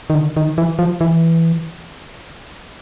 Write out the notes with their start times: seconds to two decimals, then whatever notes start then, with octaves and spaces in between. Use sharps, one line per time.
0.10 D#3
0.15 D3
0.37 D#3
0.58 E3
0.79 F3
1.01 E3